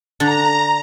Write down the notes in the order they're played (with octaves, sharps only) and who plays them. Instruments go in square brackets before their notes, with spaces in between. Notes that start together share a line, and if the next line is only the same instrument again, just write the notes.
[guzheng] D3 D4 [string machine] A#5